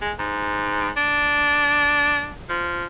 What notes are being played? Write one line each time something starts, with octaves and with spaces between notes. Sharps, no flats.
G#3
G#2
D4
F3